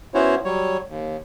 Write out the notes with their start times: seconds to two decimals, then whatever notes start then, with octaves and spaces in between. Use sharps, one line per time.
0.14 B3 C#4 E4 F#4 C5 C#5
0.45 F#3 G3 C#5
0.89 D#2